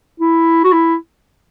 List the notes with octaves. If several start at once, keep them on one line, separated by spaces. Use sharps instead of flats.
E4
F#4
E4